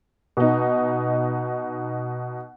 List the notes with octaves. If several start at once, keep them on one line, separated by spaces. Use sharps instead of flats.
B2 D#4